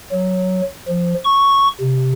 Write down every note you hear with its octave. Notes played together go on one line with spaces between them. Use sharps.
F#3
F3
C#6
C3